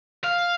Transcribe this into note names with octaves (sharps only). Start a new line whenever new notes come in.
F5